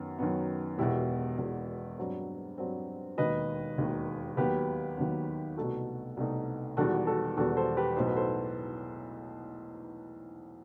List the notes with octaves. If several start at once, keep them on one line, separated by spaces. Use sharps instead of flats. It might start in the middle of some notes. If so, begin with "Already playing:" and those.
Already playing: F#2 D#3 F#3 B3
F#2 D#3 F#3 B3
E1 E2 B2 E4 G4
E1 E2 B2
G2 F#3 C4
G2 F#3 C4
E1 D#2 D#3 B4 D#5
E1 D#2 D#3
D#2 D#3 F#3 B3 G4 B4
D#2 D#3 F#3 B3
C2 B2 A3 D#4 F#4 A4
C2 B2 A3 D#4
E1 E2 D#3 G3 B3 F#4 A4
F#4 A4
E1 E2 D#3 G3 B3 F#4 A4
A4 C5
G4 B4
B1 A2 F#3 B3 D#4 C5
B4
A4 C5